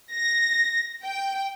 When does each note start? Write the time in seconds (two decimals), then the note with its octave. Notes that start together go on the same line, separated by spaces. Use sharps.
0.13 A#6
1.01 G5